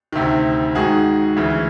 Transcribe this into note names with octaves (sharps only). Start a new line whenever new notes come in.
D2 C3 D#3
G#2 D#3 F#4 G#4
D2 C#3 E3